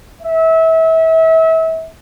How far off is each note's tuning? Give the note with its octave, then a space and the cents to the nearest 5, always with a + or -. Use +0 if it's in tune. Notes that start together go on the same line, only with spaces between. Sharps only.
E5 -30